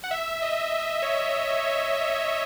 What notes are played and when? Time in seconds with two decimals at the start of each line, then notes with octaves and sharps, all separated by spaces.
0.04 F#5
0.11 E5
0.42 D#5
1.02 C#5